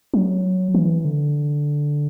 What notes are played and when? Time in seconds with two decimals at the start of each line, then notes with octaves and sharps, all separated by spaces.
0.14 F#3
0.75 E3
1.05 D3